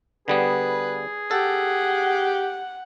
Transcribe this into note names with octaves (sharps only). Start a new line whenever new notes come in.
D3 G3 B3 G#4 B4
G4 A4 F#5